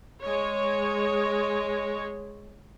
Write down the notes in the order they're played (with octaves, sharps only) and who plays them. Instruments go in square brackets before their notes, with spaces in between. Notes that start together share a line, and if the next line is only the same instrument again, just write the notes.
[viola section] G#3 C#5